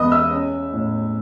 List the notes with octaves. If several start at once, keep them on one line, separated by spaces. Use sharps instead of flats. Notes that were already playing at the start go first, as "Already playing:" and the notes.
Already playing: E2 G#3 B4 D#5 B5 D#6
E5 E6
C#4
A2